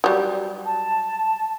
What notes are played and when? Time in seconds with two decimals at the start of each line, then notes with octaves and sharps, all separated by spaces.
0.04 F#3 G3
0.66 A5